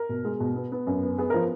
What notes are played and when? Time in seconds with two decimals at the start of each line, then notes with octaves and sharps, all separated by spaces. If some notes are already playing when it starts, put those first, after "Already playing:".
Already playing: A#4
0.09 B2
0.25 G#3
0.40 B2
0.56 B3
0.72 B3
0.87 F#2
1.03 B3
1.18 B3 G#4
1.30 F3 A#4